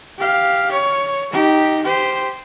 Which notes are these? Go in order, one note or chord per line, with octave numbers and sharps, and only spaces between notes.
G4 F5
C#5
D#4 G4
G4 C5